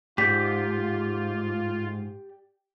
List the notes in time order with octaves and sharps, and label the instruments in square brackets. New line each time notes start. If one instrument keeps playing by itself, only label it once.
[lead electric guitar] G#2 [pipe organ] F4 [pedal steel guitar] G4 D5 G6 [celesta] B6